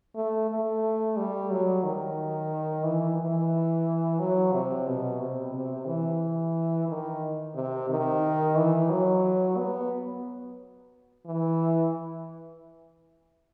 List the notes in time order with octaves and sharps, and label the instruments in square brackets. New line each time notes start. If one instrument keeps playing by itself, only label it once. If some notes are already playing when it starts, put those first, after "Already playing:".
[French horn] A3
A3
G3
F#3
D#3
E3
E3
F#3
C3
B2
C3
C3
E3
D#3
C3
D#3
E3
F#3
B3
E3